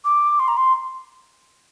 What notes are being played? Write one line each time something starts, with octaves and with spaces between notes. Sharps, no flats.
D6
C6
A#5
C6